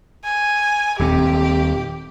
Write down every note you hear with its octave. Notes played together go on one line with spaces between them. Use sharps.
G#5
D#1 D#2 C4 G4